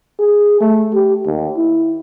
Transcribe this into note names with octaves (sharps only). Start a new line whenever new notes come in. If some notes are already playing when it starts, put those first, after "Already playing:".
G#4
A3
G4
D#2
E4